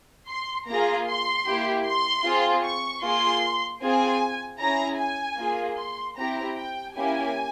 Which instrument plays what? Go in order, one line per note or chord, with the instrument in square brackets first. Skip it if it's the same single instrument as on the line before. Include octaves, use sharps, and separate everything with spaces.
[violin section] C6
A#3 F4 G#4 A#5
C6
A#3 E4 G4
C6
C4 F4 G#4
C#6
A#3 F4 G#4 C6
C4 F4 G#4 G#5
C#4 E4 G#4 A#5
G#5
A#3 F4 G#4
C6
C4 E4 G4 A#5
G5
A#3 C#4 E4 G4 G#5